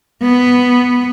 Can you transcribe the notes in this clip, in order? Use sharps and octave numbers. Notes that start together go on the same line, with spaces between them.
B3